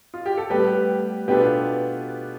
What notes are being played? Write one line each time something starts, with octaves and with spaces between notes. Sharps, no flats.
F4
G4
A4
A2 G3 B3 G4 B4
B2 B3 D4 F4 G4 A4 B4